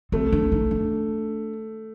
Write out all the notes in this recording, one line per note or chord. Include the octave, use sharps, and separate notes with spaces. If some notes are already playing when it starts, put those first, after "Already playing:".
A3 C4
D4
D#4
D4